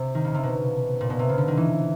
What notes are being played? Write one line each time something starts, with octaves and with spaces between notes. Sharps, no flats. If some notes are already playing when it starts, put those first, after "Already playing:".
Already playing: C3
D#3
C#3
C3
B2
A#2
B2
C3
C#3
D3
D#3
E3